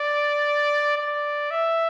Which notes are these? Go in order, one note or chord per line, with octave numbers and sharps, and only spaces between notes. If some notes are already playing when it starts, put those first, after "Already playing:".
Already playing: D5
D5
E5